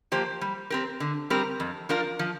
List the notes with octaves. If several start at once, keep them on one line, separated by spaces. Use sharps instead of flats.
F3 A#3 G4 C5
G3
C4 G4 A#4
D3
G3 C4 G4 A#4
F2
F3 D4 F4 A#4
F3